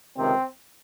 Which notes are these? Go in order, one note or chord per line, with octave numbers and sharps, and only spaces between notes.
C#2 C3 D#3 C4